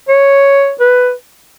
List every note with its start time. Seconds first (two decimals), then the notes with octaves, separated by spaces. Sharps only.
0.09 C#5
0.80 B4